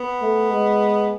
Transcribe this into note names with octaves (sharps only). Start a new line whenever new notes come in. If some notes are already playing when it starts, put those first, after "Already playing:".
Already playing: B3
A3
G#3